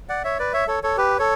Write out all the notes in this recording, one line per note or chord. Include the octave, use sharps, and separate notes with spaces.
D5 F#5
C#5 E5
B4 D5
C#5 E5
A4 C#5
A4 C#5
G4 B4
A4 C#5